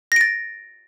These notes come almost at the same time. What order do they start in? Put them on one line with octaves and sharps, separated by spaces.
A#6 D7 A6